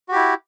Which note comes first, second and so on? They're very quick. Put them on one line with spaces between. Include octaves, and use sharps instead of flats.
F#4 G4 E4